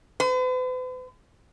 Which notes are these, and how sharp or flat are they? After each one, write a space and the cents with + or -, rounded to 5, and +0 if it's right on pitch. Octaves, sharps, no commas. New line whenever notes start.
B4 +45